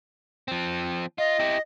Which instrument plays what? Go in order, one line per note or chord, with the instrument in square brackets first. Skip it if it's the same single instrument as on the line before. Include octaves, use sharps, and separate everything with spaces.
[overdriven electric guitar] F3 C4
[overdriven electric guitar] F4 [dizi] D#5
[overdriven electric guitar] E4 G4